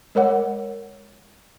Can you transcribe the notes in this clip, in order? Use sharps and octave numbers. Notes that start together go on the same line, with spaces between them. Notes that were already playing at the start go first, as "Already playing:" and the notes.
G#3 A#4 C#5 F#5